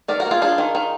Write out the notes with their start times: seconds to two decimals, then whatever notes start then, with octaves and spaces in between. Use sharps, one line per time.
0.08 D#3 A#4 D5
0.20 F#4 A#4
0.26 A#3
0.31 F4 G#4
0.42 D4 F4 G#4
0.58 D#3
0.75 D#3